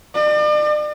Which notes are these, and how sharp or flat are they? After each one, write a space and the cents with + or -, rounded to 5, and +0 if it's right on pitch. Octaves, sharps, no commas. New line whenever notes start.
D5 +40